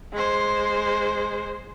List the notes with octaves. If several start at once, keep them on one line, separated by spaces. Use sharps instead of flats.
G#3 C5